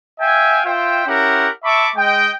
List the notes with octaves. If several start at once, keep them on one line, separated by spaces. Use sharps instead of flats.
E5 F5 G5 G#5
F4 C5 E5 G5
C#4 E4 G4 A#4 F#5
E5 A5 B5 C#6 D6
G#3 D#5 G5